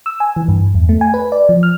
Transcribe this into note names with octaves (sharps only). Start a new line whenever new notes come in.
E6
G#5
E3
G2
E2
A3
G#5
B4
D5
F3
F6